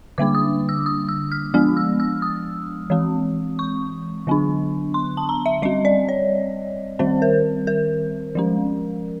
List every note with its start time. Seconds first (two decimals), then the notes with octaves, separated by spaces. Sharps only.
0.18 D3 G3 A#3 D4 D6
0.35 D#6
0.69 E6
0.86 D#6
1.09 E6
1.32 F6
1.54 F3 G#3 B3 D4 F6
1.77 E6
2.00 E6
2.22 D#6
2.90 E3 G#3 C4
3.59 C#6
4.27 D3 F#3 B3 D4
4.94 C6
5.17 A5
5.29 A#5
5.46 E5
5.62 G3 C4 D#5
5.85 D5
6.09 C#5
6.99 D#3 G3 C4 C5
7.22 A#4
7.67 A#4
8.35 F3 G#3 C#4